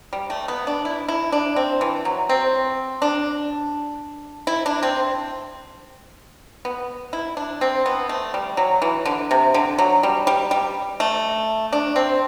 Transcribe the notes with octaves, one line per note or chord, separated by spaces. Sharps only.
G3
A3
B3
D4
E4
E4
D4
C4
E3
F#3
C4
D4
E4
D4
C4
B3
E4
D4
C4
B3
A3
G3
F#3
E3
D3
C3
D3
F#3
G3
G3
G3
A3
D4
C4